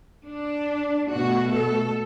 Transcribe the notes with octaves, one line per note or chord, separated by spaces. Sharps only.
D4
B2 A3 F#4
A4